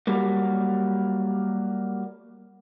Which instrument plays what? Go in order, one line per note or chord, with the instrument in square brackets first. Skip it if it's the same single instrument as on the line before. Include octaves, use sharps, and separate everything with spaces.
[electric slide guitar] F#3 G3 A#3